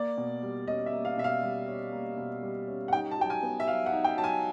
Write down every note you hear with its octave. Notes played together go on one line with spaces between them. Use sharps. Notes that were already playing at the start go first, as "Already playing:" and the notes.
Already playing: A#3 D5
B2
G3
C#4 D#5
E5
A#3
F5
B2 E5
F5
G3
C#4
A#3
B2
G3
C#4
F#5
D#4 G5
A5
F#3 G5
G#5
B3
E5
F#3 F5
F#5
D#4
G5
F#3 A5
G#5